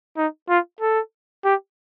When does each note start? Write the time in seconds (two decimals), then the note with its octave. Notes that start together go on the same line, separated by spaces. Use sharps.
0.17 D#4
0.49 F4
0.81 A4
1.45 G4